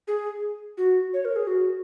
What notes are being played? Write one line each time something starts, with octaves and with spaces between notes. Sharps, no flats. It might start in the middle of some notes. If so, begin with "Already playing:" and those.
G#4
F#4
C#5
A#4
G#4
F#4